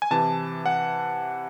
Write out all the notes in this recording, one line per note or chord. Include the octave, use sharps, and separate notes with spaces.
G#5
C3 E3 A5
F#5